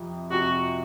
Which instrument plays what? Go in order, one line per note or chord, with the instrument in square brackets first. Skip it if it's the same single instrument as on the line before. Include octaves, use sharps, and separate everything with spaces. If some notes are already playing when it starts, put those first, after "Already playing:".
Already playing: [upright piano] F2 C3 F3
[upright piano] F2 C3 F3 [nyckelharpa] F#4